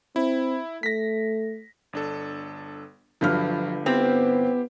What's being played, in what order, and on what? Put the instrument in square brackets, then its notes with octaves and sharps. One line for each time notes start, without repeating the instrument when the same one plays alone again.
[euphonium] C4 [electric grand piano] E4
[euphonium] A3 [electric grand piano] A#6 B6
[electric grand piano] G1 D4 A4
[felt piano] G1 G2 F6 [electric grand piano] F3 F#3 G6
[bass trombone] B3 [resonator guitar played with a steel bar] C4 [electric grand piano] E4 G4 C5